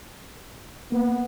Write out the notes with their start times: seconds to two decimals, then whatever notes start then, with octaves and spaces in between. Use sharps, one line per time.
0.92 A#3 B3